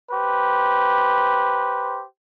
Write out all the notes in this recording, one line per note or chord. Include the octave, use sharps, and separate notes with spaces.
G4 B4 C5